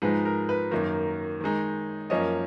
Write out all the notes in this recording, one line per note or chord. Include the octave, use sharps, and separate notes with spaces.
G#2 F3 G#3 D#4 B4
A#4
B4
F#2 D#3 A#3
D#3 G#3 D#4
F#2 F3 A#3 C#4 D#5